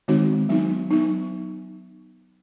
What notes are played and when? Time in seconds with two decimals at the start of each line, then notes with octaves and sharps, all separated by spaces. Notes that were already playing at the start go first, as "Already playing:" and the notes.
0.08 D#3 G#3 C4 D#4 F#4
0.49 F#3 B3 D#4
0.91 F#3 B3 D#4